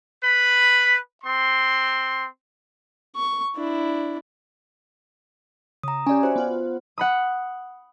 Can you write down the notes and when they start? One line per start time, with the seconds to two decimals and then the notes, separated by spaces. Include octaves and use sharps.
0.23 B4 B5
1.24 C4 C6
3.16 C#6
3.56 D4 E4
5.83 C#3 A#5 D#6
6.07 C#4 G4 D5 G#5
6.23 F#4 C5 C#5 E5
6.36 B3 F4 F#5
6.98 F#5 B5 D#6